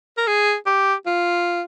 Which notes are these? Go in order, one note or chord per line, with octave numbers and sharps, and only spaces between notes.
A#4
G#4
G4
F4